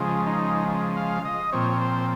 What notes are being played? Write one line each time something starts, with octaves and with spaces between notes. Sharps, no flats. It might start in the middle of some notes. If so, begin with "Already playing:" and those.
Already playing: C#3 F3 G#3
D#4
F5
D#5
A#2 F3 C4 C#5
C5